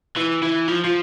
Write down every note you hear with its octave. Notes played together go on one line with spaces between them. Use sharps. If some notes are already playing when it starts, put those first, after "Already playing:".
E3
E3
F3
F3